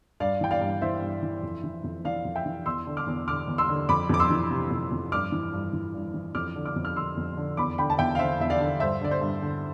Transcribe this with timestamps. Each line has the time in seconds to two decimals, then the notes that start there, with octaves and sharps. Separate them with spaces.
0.20 G2 D5 F5
0.41 E3 G5
0.51 D5 F5
0.61 G2
0.82 E3 C5 E5
1.02 G2
1.23 E3
1.43 F2
1.64 E3
1.84 F2
2.05 E3 D5 F5
2.25 F2
2.36 E5 G5
2.46 E3
2.66 E2 C6 E6
2.87 D3
2.97 D6 F6
3.07 E2
3.27 D3 D6 F6
3.48 E2
3.58 C6 E6
3.69 D3
3.89 F2 B5 D6
4.09 F2 D6
4.20 C6 E6
4.30 E3
4.51 C3
4.71 F2
4.92 F2
5.12 G2 D6 F6
5.32 E3
5.53 G2
5.73 E3
5.94 G2
6.14 E3
6.35 F2 D6 F6
6.56 D3
6.65 D6 F6
6.76 F2
6.85 F6
6.96 D3 C6 E6
7.17 F2
7.37 D3
7.57 E2 B5 D6
7.78 D3 G5 B5
7.90 A5
7.98 E2 E5 G5
8.15 F5
8.19 D3 C5 E5
8.40 E2 E5
8.50 D5 F5
8.60 D3
8.80 G2 C5 E5
9.01 D3 D5
9.11 C5
9.21 G2
9.42 D3